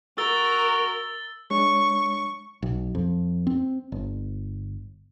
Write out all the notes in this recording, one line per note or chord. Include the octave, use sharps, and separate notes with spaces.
F#4 A#4 E6 A6 G7
G#3 D4 C#5 C#6
B1
F2
C4
G1